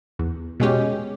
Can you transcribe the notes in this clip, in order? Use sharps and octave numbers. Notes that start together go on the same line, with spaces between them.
E2
B2 G#3 C#4 G4